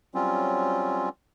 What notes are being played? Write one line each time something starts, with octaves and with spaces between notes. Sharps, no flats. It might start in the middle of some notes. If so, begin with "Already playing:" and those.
F#3 G3 C4 C#4 F4